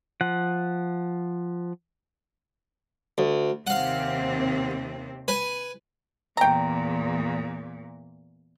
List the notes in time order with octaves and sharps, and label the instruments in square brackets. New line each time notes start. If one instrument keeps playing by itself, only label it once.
[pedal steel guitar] F3 F#5
[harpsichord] D2
[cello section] D#2 C3 C4 [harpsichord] F5 F#5
[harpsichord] B4 G#5
[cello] E2 A#2 [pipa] G5 A#5